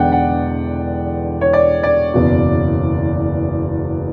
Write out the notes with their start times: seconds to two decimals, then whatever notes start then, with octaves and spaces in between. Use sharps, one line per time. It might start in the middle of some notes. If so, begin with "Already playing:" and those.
Already playing: E1 E2 D3 D5 F#5 G5
0.12 F#5
1.41 C#5
1.53 D5
1.83 D5
2.14 F#1 E2 B2